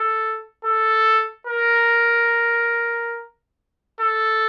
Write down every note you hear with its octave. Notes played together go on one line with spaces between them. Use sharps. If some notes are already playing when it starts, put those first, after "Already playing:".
Already playing: A4
A4
A#4
A4